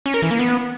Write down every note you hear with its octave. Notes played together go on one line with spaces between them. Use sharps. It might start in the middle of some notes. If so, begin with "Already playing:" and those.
C#4
A#4
E3
A#3
B3